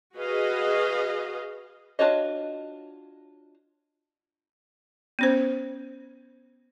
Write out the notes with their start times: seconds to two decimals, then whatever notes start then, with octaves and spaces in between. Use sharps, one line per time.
0.16 F#4 G#4 B4 D#5 F5
1.99 D4 F4 F#4 C#5 D#5
5.19 B3 C#4 C5